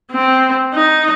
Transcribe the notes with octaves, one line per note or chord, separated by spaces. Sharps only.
C4
D#4